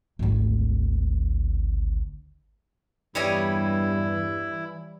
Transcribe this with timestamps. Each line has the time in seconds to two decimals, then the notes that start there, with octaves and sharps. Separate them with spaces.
0.19 G#1 D2
3.15 E2 G2 E3 G3 E4 C#5 D#5